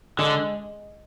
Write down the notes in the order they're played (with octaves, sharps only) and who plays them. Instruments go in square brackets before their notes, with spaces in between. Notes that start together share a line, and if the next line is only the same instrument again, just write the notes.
[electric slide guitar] D3 [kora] G#3